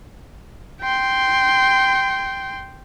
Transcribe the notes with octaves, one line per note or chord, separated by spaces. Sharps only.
G5 C6